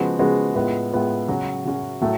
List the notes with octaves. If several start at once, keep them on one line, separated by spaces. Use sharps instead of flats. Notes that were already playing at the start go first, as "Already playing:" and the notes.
Already playing: C#3 F3 G#3 B3 F#4
C#3 F3 G#3 B3 F#4
A2 G#3 B3 F4
A2 G#3 B3 F4
C#3 F#3 C#4 F#4
C#3 F#3 C#4 F#4
A2 F#3 A3